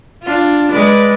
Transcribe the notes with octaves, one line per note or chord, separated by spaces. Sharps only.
D4 F4
G#3 B4 D5